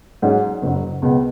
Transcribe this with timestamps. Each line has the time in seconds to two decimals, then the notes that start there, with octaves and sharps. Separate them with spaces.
0.22 G#2 F#3 C#4 F#4
0.62 F#1 F#2 F#3
1.02 C#2 B2 B3